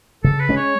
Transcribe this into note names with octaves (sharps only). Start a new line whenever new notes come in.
C#3 A4
B4
G#3 C#4
C#5